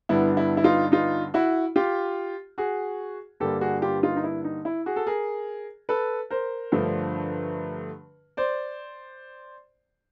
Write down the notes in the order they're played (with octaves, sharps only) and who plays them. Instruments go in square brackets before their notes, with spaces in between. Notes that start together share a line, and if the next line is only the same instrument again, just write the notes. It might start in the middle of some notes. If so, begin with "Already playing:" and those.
[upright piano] G2 D3 G3 B3 E4
E4
E4
D#4 F4
D#4 F4
E4 F#4
F4 G4
F#4 G#4
G2 D3 G3 A#3 G4 A4
F#4 G#4
F4 G4
D#4 F4
D#4
E4
D#4
E4
F#4 G#4
A4
G#4 A#4
A4 B4
A#4 C5
G2 D3 F3 A3
C5 D5